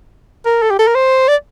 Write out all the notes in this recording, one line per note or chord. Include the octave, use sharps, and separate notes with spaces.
A#4
A4
G4
A4
A#4
C5
D5